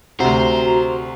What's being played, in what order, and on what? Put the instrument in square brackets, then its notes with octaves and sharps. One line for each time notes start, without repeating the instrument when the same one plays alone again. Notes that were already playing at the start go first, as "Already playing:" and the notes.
[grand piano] D2 C3 [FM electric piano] F#4 [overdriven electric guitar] C5 [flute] A#5